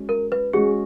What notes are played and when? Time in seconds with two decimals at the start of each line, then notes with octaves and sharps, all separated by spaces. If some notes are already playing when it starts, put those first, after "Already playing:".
Already playing: G#3 C#4 F#4
0.09 A#4
0.32 B4
0.53 G#3 C#4 F#4 G#4